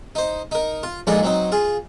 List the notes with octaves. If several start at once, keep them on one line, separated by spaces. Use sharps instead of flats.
D#4 C5
D#4 A#4
F4
A#1 G#3 D4 D#4 F4 A4
F#3 C4 D#4
F4 G#4